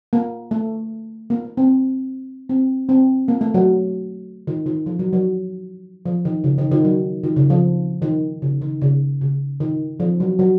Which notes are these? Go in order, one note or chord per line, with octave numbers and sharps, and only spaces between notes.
A#3
A3
A#3
A#3
C4
C4
C4
A#3
A3
F#3
D#3
D#3
F3
F#3
F#3
F3
D#3
C#3
D#3
D#3
F#3
D#3
C#3
F3
D#3
C#3
D#3
C#3
C#3
D#3
F3
F#3
F#3